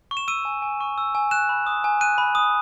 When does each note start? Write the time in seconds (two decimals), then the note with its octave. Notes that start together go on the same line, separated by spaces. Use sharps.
0.11 C#6
0.17 E7
0.28 E6 D#7
0.45 G#5
0.62 G#5
0.80 C#6
0.98 E6
1.15 G#5
1.31 F#6 E7
1.49 B5
1.67 D#6
1.84 G#5
2.01 F#6 D#7
2.18 B5
2.35 D#6